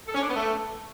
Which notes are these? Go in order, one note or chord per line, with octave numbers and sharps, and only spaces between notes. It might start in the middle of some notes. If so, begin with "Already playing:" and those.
A4
C#4
D4
B3
A3